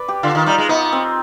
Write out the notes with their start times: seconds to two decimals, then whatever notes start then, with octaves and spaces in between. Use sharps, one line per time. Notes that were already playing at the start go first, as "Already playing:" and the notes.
Already playing: B4 D5
0.08 G4
0.23 D3 F4
0.35 D#3
0.46 G3 D#4
0.58 G#3
0.69 B3 D#4
0.93 C4